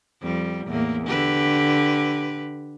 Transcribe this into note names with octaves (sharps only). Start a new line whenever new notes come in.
F2 G3
E2 A2 A#3
D3 G4 B4